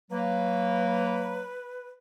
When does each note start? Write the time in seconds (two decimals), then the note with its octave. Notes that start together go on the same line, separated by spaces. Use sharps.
0.11 F#3 A#3 B4